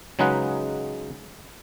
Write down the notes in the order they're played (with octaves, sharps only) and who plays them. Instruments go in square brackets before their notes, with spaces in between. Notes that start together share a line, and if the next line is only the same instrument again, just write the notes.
[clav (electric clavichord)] C#3 F#3 G#3 D#4 B4 F#5